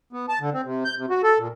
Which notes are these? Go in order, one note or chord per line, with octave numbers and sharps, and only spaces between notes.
B3
A5
D3
C4
C3
G6
C3
F#4
A4
A#2